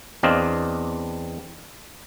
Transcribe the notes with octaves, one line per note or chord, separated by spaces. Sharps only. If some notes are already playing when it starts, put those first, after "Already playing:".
E2 C4 D4 D#5 F5